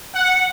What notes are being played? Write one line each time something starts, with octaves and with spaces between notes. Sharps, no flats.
F#5